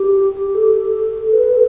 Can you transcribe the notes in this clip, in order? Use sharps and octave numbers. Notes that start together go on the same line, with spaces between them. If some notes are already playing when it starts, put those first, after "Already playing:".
Already playing: G4
A4
A4
B4
A4